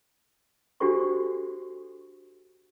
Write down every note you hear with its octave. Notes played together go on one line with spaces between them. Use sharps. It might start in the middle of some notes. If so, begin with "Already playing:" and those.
D4 F#4 G4 A4 C5 C#6